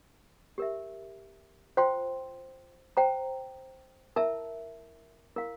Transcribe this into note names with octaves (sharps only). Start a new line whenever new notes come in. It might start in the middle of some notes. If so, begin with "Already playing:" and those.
G4 A#4 E5
F4 C5 G5 C6
C5 G5 A#5
E4 A#4 E5 A5
E4 A#4 F5